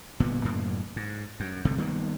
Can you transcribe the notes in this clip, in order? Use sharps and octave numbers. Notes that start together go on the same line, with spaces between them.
G1 A#2 B3
F#2 A2 C#3 A#3
G#2
F#2
G1 C3 A3
D#3 G3 A#3 B3